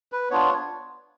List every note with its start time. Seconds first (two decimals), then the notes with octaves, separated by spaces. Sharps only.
0.12 B4
0.30 B3 D4 F4 C#5